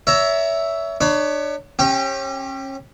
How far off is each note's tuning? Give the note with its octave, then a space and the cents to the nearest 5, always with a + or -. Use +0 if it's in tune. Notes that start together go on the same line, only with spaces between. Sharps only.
C#5 +30 E5 +0 A#5 +0
D4 +40 C#5 +20 B5 +0
C#4 -30 G4 +0 G5 +0